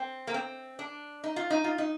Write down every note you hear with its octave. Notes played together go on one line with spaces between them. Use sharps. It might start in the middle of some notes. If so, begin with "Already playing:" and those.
Already playing: C4
A#3
C4
D4
D#4
F4
D#4
F4
D#4